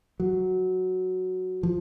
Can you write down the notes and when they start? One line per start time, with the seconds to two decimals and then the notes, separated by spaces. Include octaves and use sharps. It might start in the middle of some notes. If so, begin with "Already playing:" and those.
0.20 F#3
1.63 F3